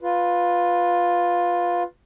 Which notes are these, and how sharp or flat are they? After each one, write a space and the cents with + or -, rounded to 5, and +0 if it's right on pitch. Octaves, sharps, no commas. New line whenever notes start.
F4 +10 B4 +0